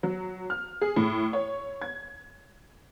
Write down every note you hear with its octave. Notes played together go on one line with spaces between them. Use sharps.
F#3
F6
G#4
A2
C#5
G#6